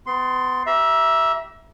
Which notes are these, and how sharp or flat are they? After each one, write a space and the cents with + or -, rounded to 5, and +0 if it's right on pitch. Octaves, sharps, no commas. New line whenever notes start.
B3 +35 C6 +0
G4 -20 E5 +0 A#5 +35